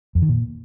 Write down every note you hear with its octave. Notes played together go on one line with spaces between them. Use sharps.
F2
D#3
A#2